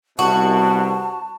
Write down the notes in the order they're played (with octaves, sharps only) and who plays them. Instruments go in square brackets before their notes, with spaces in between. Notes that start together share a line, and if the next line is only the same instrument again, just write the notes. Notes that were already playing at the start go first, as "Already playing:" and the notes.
[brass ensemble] C2 B2 [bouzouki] F#4 [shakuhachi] A5